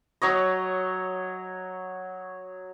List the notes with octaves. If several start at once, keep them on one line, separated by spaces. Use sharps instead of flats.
F#3 C#5 D#5